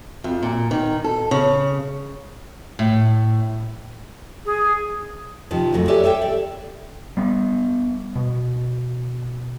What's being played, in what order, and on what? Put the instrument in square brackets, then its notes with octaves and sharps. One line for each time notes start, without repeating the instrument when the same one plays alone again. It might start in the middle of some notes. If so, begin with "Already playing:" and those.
[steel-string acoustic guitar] F2
A#2
D#3
A4
C#3
A2
[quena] G#4
[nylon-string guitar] C3 D#3 F3
F2 F#3 G#3 A3
G4 A4 C#5 D5 E5 G#5
A4 C#5 E5 G5
D5
[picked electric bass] G3 B3
B2